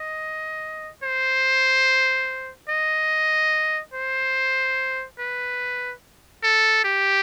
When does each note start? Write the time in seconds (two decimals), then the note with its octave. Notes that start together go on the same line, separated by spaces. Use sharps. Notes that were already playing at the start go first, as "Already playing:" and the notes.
Already playing: D#5
1.03 C5
2.69 D#5
3.93 C5
5.19 B4
6.44 A4
6.84 G4